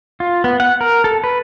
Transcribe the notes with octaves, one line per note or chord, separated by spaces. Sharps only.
F4
B3
F#5
A#4
A4
B4